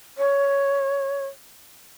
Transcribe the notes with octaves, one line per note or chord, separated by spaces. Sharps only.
C#5